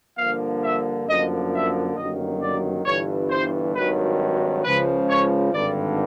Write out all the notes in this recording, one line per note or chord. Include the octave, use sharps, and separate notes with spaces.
G2 D3 F3 A#3 F5
E5
G1 F#2 D3 F3 A#3 D#5
E5
G1 F#2 D#3 F#3 A#3 D#5
D5
G1 G2 E3 C#5
C5
G#1 G2 D#3 F#3 B4
C#2 C#3 F3 B4
C#5
G#1 G2 D3 D5